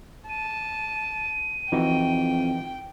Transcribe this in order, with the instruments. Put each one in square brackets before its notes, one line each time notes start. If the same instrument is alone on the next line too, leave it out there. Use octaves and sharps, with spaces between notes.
[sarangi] A5 [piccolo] D#7
[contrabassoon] F2 [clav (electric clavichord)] E3 D#4 F#4 [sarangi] G5